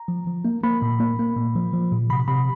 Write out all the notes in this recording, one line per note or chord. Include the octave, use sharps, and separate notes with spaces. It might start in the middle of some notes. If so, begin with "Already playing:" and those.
Already playing: A#5
F3
F3
A#3
A#3 B5
A#2
A#3
A#3
A#2
F3
F3
A#2
C3 B5
C3 B5